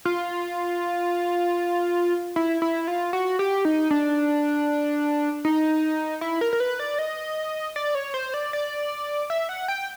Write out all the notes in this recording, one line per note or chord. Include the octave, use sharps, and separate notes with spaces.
F4
E4
E4
F4
F#4
G4
D#4
D4
D#4
E4
A#4
A#4
B4
D5
D#5
D5
C#5
C5
D5
D5
E5
F#5
G5